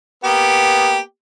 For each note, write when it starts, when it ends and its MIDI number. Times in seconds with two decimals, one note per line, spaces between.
0.24 0.98 58
0.24 0.98 59
0.24 0.98 67